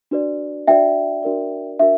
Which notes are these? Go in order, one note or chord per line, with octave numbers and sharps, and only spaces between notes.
D4 F#4 B4 D5
D4 F#4 B4 D5 E5 G5
D4 F#4 A#4 D5
D4 F#4 A#4 E5